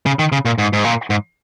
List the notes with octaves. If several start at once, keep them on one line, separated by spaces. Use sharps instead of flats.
C#3
D#3
C#3
A#2
G#2
G#2
A#2
G#2